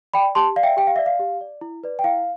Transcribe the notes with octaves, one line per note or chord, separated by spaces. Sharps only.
D5 G5 B5
G4 A5 C6
D5 F5
E5 G5
G4 G5
F5
D5 E5
F5
G4
D5
E4
B4 D5
G5
E4 F5